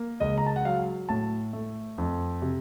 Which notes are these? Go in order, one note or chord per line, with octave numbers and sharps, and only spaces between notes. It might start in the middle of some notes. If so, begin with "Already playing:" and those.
Already playing: A#3
C#2 D#5
A#5
A5
F#5
F#3 F5
A2 A5
A3
F2
C3